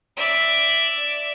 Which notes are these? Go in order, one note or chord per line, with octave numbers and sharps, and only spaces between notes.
D5 E5